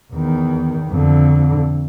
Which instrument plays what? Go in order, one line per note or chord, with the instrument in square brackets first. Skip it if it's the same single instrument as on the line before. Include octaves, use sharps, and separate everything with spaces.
[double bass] E2 D#3
F2 D3